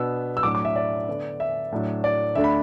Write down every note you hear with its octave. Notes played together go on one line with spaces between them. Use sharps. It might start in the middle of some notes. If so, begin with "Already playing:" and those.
Already playing: B2 B3 D4 E6
E6
A2 F#3 D4 D6
D6
E5
D5
D3 B3 D4
E5
A2 F#3 D4
D5
D2 D3 A3 D4 E5
B5